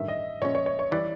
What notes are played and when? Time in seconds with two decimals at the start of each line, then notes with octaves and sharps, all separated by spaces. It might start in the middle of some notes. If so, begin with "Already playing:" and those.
Already playing: A1 G2 D#3 E5
0.08 D#5
0.42 A#2 F3 G#3 C#4 C#5
0.55 C#5
0.66 C#5
0.79 C#5
0.91 E3 G3 D5